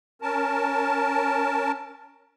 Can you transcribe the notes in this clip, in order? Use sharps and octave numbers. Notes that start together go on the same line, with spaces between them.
C#4 A#4 A5